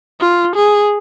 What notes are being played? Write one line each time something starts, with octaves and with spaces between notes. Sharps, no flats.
F4
G#4